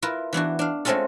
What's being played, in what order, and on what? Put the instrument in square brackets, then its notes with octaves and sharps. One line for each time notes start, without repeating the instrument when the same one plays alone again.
[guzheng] E4 F4 A#4 B4
E3 B3 D4 F#4
D4 F5
G#3 A3 C4 C#4 F4 A4